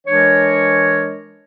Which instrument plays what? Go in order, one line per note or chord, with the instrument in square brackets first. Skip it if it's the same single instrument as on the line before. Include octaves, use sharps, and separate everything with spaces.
[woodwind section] E3 G#3 D4 A#4 C#5